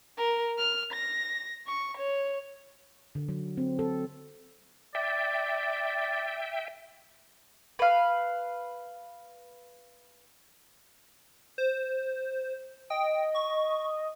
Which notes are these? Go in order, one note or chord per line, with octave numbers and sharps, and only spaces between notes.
A#4
F6
A#6
C#6
C#5
D3
F#3
C4
A4
D5 E5 G5
B4 F5
C5
D#5 G5
C#6